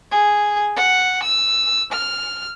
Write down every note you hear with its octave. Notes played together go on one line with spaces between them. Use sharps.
G#4
F#5
E6
F6